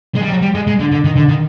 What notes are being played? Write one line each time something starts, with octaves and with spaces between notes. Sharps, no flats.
G#3
G3
F#3
G3
G#3
G#3
D3
D3
D#3
D3
D#3